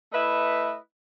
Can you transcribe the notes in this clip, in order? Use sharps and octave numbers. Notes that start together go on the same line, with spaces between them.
A3 E4 B4 D#5 E5